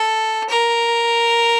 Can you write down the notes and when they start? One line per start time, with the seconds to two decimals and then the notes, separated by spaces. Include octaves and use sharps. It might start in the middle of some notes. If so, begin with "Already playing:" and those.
Already playing: A4
0.49 A#4